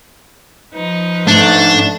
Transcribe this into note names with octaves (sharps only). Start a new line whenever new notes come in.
F3 D#4 B4
G#2 A3 D4